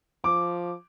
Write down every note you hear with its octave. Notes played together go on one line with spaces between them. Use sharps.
F3 D6